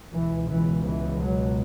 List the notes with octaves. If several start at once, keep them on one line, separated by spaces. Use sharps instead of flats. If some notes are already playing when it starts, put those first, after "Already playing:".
C#2 B2 E3
E3
E3
F#3